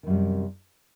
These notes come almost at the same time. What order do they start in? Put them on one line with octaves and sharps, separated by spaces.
D#3 F#2 G3 C3